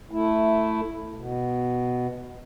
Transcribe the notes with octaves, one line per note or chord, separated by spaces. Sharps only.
A3 E4
B2